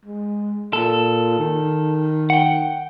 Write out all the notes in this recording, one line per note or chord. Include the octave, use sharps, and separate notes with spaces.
G#3
A#2 A4
D#3
F#5 G5